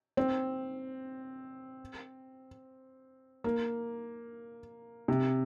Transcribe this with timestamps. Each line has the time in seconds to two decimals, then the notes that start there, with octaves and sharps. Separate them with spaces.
0.17 C4
3.44 A#3
5.08 C3